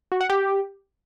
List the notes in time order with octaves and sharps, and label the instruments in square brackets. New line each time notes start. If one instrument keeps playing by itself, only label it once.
[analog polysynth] F#4
F#5
G4